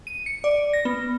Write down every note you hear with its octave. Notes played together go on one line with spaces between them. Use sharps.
D#7
C#7
D5
A#6
B3